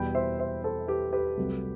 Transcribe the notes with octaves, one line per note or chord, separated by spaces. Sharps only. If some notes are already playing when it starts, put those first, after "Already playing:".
Already playing: E2 B2 G3 G5 B5
C5 E5
C5 E5
A4 C5
G4 B4
G4 B4
C2 C3 F#3 A3